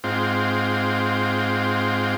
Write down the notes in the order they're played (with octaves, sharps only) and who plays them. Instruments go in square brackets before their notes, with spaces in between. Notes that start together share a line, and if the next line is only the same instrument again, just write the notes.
[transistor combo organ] G#2 C4 F4